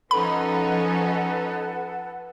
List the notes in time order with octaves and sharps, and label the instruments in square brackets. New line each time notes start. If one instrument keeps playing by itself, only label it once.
[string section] F3 C#4 D#4 [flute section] A4 B4 F#5 [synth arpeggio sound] B5